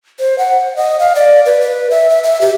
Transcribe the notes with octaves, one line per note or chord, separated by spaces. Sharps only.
C5
F#5
D#5
F5
D5
B4
B4
E5
E5
E5
G4